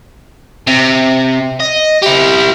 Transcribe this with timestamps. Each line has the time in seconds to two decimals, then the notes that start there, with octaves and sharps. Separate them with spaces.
0.67 C3
1.60 D#5
2.02 E4 G4